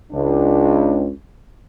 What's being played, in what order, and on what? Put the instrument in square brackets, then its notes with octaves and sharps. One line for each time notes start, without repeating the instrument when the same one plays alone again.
[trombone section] C#2 D4